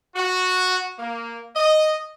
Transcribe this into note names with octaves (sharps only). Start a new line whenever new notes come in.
F#4
A#3
D#5